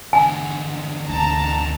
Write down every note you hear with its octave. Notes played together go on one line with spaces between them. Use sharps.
E2 D3 G#5
D2 C4 A5 A#5